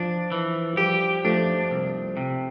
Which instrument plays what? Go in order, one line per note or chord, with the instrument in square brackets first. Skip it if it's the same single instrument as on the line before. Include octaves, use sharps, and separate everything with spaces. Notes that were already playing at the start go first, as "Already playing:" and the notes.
Already playing: [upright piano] F3 [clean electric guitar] D4
[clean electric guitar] E3
[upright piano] F3
[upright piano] G3 [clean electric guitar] G4
[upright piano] F3 A3 [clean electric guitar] D4
[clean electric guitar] C2
C3